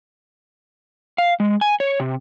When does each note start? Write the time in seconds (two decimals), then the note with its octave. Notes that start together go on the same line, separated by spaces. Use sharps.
1.18 F5
1.40 G#3
1.61 G#5
1.80 C#5
2.00 C3